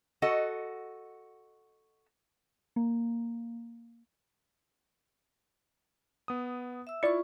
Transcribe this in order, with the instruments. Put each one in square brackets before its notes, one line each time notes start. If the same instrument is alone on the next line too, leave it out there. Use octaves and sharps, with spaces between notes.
[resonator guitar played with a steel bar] F#4 A4 D#5 F#5
[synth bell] A#3
[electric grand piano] B3 D#6
[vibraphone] E5 E6
[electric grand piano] E4 [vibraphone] F4 C#6 [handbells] D5 C#7